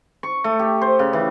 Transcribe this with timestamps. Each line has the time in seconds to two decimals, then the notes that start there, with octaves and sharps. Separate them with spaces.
0.23 C#6
0.44 A3
0.59 G4
0.81 C5
0.99 C#3
1.13 E3